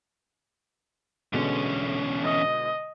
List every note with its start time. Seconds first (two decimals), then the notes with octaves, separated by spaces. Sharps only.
1.33 E2 B2 D3 G#3 C#4
2.24 D#5